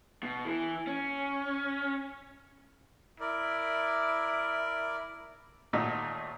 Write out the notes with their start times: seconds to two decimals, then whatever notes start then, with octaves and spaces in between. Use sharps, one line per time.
0.23 B2
0.45 E3
0.87 C#4
3.20 E4 A#4 D5
5.73 D#2 A#2 A3 D#4 F#4 D#5